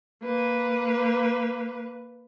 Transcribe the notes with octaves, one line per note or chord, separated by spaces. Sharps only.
A#3 B4